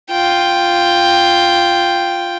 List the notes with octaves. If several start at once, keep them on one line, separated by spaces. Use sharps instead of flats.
F4 G5